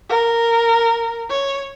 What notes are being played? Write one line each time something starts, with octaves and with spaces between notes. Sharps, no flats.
A#4
C#5